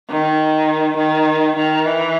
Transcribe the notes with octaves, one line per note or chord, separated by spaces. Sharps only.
D#3
D#3
D#3
E3